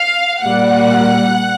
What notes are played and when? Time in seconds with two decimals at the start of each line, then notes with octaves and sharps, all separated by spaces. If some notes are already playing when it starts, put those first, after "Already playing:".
Already playing: F5
0.42 A#2 G3 A#3 F#5